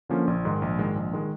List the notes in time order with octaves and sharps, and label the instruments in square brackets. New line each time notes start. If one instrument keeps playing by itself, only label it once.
[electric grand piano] D3 F3 A#3 C#4
A#1
G#2 D#3 G#3
A#1
G#2 D#3 G#3
A#1
D#3 G#3